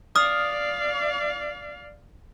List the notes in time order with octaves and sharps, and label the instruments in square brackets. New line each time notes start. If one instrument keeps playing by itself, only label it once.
[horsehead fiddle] D5 F5 [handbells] D#6 F6